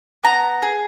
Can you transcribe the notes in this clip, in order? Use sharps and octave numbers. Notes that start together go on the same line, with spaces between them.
B3 A#5
G#4